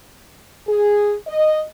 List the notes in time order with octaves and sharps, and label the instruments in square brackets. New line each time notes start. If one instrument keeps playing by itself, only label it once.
[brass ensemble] G#4
D#5